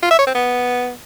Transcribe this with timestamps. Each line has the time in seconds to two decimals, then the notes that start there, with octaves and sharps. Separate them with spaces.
0.02 F4
0.11 E5
0.19 C#5
0.27 C4
0.35 B3